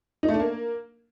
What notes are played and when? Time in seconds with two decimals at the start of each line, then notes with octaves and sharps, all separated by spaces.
0.23 D#4
0.29 A3
0.34 D4
0.40 A#3